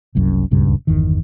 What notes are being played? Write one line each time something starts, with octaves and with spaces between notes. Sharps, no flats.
F#1 C2 F#2
D#1 C#2 G2 C#3
G1 E2 D#3